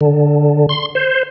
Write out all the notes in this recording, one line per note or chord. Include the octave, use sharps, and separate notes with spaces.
D3
C6
C5